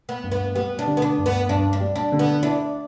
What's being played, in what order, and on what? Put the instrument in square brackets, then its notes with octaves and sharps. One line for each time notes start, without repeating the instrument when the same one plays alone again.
[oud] B3
[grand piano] G2
[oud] B3
[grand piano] G3 [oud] B3
[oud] D4
[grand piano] D3
[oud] B3
D4
[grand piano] G2
[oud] B3
[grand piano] G2 [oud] D4
[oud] D4
[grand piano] G3
[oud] D4
[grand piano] D3
[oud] B3
[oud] D4 [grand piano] E4